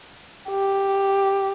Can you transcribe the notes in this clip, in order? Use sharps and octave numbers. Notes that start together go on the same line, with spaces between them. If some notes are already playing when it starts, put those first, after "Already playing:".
G4